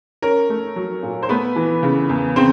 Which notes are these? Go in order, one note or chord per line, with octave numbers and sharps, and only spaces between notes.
C#4 A#4
A3
F#3
A#2
C5
A3 B3 B4
E3
C#3
E2
C#3 C4 C5